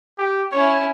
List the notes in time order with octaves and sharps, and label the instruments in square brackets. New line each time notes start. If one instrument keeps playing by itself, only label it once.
[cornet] G4
[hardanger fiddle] C#4 E4 [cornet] C#5